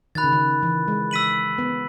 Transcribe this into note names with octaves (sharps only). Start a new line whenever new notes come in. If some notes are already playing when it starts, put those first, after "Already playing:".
D#3 B5 F#6 A6
C#3
D#3
E3
G#3
E6 B6 D#7 F#7
B3